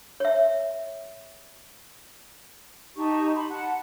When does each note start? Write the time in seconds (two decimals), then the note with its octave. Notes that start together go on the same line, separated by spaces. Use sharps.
0.20 C#5 E5
2.97 D#4 G4 A5 C#6
3.34 B5 C6
3.50 F#5 A5 F#6